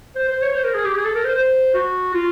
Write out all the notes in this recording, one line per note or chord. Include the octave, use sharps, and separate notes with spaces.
C5
C5
C#5
C5
A#4
G#4
G4
G#4
A4
A#4
C5
C5
F#4
F4